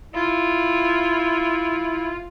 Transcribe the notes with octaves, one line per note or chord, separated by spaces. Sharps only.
E4 F4